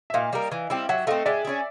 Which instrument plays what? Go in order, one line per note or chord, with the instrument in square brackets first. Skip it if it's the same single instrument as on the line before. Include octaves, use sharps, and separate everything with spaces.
[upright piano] E5
[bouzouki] A#2 [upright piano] D#5 F5
[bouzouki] G3 A#3
E3
G3 C4 E4
[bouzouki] F#3 [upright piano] E5 F#5
[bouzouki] A3 C4 [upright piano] D#5 F5
[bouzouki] G#3 [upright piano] D5 E5
[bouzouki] C#4 E4 G#4